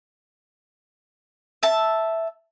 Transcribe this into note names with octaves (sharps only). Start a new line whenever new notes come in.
E5 A5